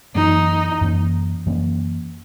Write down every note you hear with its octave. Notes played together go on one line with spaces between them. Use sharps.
F#2 E3 A#3 C#4 D#4
F#2 E3 A#3 C#4
F#2 E3 A#3 C#4